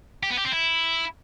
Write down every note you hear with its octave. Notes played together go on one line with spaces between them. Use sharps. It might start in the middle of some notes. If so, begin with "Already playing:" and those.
G4
B3
G4
C4
E4